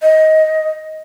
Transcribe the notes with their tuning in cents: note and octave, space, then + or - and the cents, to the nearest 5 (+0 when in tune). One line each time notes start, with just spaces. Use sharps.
D#5 +15